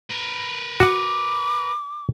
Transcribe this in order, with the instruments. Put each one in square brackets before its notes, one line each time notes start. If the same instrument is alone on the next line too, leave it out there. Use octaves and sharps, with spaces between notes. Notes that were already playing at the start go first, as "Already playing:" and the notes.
[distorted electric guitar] A#4 B4
[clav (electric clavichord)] F#4 F#5 [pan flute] D6